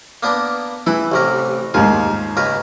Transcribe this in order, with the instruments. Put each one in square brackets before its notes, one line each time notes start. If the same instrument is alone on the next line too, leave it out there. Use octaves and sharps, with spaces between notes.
[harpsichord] A#3 B3 D4
[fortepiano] E3 [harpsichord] E4
[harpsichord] A1 C3 A#4
[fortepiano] D#2 G#2 [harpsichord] F4
[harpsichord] C#2 A#4 B4